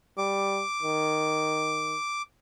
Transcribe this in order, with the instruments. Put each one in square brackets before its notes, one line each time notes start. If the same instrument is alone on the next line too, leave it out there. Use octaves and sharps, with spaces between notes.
[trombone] G3 [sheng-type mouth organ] D6
[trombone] D#3